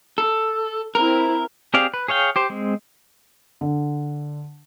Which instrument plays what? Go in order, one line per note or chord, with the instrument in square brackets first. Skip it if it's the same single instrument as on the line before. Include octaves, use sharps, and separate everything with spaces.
[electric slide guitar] A4
[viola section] C4 E4 [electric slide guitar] A#4
[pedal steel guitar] C4 G4 G#4 D5 F5
B4
G#4 C#5 F5 G5
G4 C5
G#3 C4
[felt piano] D3